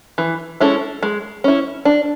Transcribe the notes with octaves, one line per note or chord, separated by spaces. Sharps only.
E3
G#3 C#4 E4 A4
G#3
C#4 E4
D4